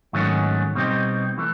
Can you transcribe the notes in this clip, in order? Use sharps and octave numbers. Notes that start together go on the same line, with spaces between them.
G#2 D#3 F#3 A3 C#4
B2 G3 C4 D#4 G4
E3 A3